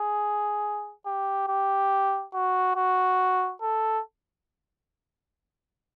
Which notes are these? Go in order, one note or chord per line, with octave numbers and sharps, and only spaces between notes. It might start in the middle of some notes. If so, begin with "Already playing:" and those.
Already playing: G#4
G4
G4
F#4
F#4
A4